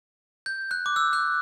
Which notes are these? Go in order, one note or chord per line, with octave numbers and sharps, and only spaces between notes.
G6
F#6
D6
E6
F#6